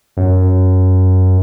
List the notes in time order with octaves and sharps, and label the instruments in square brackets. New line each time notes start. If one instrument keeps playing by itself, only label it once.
[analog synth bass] F#2